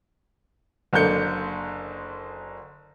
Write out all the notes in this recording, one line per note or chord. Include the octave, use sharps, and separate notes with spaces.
F#1 D3 A#3 G6 C#7